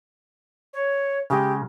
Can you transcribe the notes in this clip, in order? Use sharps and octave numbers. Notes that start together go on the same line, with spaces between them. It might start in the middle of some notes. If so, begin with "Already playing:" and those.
C#5
C#3 G#3 G4